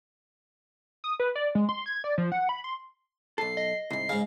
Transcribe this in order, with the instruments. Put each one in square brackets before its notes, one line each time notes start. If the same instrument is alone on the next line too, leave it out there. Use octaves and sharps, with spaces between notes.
[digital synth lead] D#6
B4
D5
G#3
C6
G#6
D5
F3
F#5
B5
C6
[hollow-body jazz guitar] B1 A4 [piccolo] C7
[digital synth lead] D#5
[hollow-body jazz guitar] C2 G#2 [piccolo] C7
[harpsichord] G#2 C#3 [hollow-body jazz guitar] F5